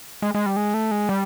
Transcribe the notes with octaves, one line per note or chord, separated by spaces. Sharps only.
G#3
G#3
G3
G#3
A3
G#3
G3